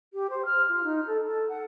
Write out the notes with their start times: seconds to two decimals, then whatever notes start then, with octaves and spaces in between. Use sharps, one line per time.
0.13 G4
0.30 C5
0.45 F6
0.69 F4
0.84 D#4
1.07 A4
1.24 A4
1.49 F#5